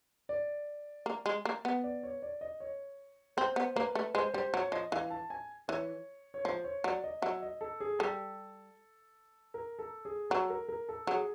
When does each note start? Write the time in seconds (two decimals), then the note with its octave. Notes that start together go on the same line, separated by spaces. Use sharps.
0.29 D5
1.06 A#3
1.26 G#3
1.45 A#3
1.65 B3
1.84 D5
2.03 C#5
2.22 D5
2.41 D#5
2.60 C#5
3.37 C4 C5
3.56 B3
3.76 A#3 B4
3.95 A3
4.14 G#3 C5
4.34 G3 C5
4.54 F#3 C#5
4.72 F3 D#5
4.92 E3 F5
5.10 A5
5.30 G#5
5.68 E3 C#5
6.34 C#5
6.45 F3 C5
6.64 C#5
6.84 F#3 D5
7.04 D#5
7.22 F#3 E5
7.42 D#5
7.61 A4
7.80 G#4
7.99 G3 A4
9.54 A#4
9.79 A4
10.05 G#4
10.30 F#3 A4
10.50 A#4
10.68 A#4
10.89 A4
11.07 F#3 G#4